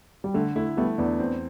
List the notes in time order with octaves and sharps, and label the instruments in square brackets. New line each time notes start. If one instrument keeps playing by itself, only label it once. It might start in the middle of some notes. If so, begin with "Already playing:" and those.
[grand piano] G3
[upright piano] D3 [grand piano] A3
[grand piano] A3 [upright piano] E4
[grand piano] G3 B3 [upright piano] A3
[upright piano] E2 [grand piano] B3 D4
[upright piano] C4